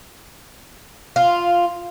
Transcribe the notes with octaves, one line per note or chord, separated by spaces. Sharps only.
F4